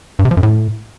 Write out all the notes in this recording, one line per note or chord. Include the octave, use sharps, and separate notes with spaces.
G2
C3
F3
F#2
A2